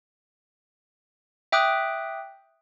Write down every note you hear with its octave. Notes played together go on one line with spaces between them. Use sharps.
E5 G5 D6 D#6 F#6